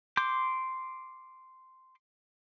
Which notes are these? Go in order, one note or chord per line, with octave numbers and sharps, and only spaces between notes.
C6 D6 G6